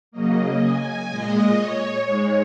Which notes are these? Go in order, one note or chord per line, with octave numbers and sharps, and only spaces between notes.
C#3 F#3 A#3 D#5
G#5
A#2 G#3 D#5
C#5
G#2 G#3